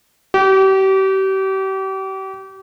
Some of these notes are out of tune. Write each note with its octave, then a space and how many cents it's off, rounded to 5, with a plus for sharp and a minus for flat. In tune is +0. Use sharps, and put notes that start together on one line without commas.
G4 -35